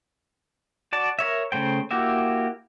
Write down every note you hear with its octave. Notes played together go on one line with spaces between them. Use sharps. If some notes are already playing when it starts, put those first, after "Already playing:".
F#4 D5 A5
A#4 C#5 E5
C#3 A3 C5 G5
A#3 E4 F#4 G4 E5